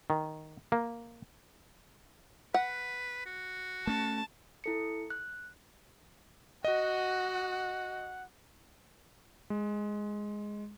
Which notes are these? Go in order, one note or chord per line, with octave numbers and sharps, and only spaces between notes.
D#3
A#3
B4 F#5
F#4
A3 C#4 A5
E4 A4 C#7
F#6
F#4 D#5 F#5
G#3